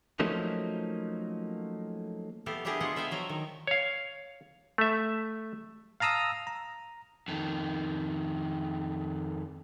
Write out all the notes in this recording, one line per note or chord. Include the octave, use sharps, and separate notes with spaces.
F3 F#3 A3 A#3 C#4 D#4
B3 E4 G4 A4 F5
B3 D4 E4 G4 G#4 A#4
G#3 B3 F4 F#5
B3 E5 F5 G5 G#5
F3 F#3 A#5
D#3
C#5 F5
A3 E5
F5 A5 A#5 D#6 E6
A#5
F2 D#3